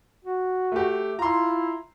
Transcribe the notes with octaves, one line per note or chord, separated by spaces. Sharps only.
F#4
A3 G4
E4 F4 A#5 C6